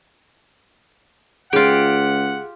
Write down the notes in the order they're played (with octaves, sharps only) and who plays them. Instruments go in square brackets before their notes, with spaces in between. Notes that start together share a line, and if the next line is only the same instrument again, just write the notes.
[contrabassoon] C#2 [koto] F4 G4 [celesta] G#4 D7 [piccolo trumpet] F#5